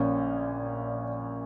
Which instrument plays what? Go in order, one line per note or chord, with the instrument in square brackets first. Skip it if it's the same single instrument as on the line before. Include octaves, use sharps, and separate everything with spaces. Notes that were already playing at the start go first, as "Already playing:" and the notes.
Already playing: [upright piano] A#1 A#2 A#3 C#4